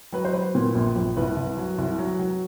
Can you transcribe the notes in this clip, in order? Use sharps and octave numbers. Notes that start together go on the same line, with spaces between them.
F#3 B4
C5
F#3 B4
A#2
A#1
A#1
C2 B4
C2
F#3
C2
F#3
F#3